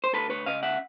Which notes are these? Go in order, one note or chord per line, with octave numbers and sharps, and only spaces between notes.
C5
D2 A4 B4
B4 C#5
C#3 D#5 F5
E5 F#5